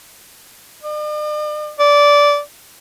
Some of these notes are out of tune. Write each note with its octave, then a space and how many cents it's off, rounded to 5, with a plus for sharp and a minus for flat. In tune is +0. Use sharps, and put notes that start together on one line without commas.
D5 +45
D5 -15